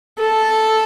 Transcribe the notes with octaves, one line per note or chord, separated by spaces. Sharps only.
A4